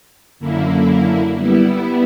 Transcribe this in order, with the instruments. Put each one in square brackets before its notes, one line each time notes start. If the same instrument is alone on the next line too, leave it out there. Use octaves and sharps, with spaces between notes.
[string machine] F#2 D3 A#3 E4
G3 B3 E4